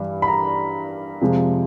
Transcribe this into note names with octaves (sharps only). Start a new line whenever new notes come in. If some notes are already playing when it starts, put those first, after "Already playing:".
Already playing: G2 E3 G3
B5
A#5
F2 C3 F3 G#3